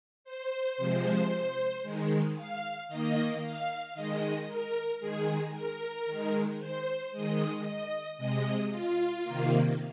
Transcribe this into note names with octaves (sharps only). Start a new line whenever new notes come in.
C5
C3 F3 G#3
D#3 G#3
F5
D#3 A#3 D#5
F5
D#3 G#3 D#5
A#4
D#3 G#3 G#4
A#4
D#3 G#3
C5
D#3 G#3 D#5
D#5
C3 G#3 D#5
F4
C3 D#3 A#3